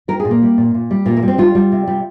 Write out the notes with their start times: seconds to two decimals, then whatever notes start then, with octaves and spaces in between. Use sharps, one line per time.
0.08 G3 A#4
0.20 G#4
0.25 A#2
0.31 A#3
0.42 G3
0.58 A#2
0.74 A#2
0.91 G3
1.06 A#2 A#3
1.17 A#3
1.23 G3
1.28 C4
1.38 G3 F4
1.55 G3
1.72 C3
1.87 G3